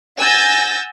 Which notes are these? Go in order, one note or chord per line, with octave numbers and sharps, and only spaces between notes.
F#5 G#5 E6 G6 A6 A#6